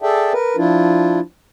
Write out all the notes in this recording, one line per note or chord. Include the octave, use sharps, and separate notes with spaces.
G#4 A4 D5 E5 G5 A5
A#4 B4
F3 D4 E4 F4